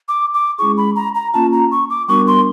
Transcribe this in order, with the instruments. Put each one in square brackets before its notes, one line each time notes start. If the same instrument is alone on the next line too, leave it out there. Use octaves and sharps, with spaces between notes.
[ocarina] D6
D6
[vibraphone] G#3 C#4 E4 G#4 [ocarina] C#6
[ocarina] B5
A#5
A#5
[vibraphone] A#3 C#4 F4 [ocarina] A5
[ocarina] A#5
C#6
D6
[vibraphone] G3 B3 D4 F#4 A#4 [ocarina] C#6
[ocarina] C6